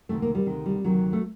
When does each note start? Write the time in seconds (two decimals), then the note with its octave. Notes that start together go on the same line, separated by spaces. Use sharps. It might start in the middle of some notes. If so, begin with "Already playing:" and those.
0.09 D2 C3 D#3 A3
0.22 A#3
0.35 G3
0.46 D2 C3 D#3
0.66 G3
0.84 D2 C3 D#3 F#3
1.13 A3